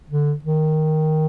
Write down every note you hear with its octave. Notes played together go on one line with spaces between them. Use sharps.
D3
D#3